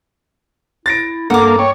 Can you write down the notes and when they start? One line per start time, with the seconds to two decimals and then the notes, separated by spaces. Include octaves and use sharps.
0.86 E4 A6 A#6 D7
1.30 G2 A#3 A4 F#5 D6
1.59 C#5 G5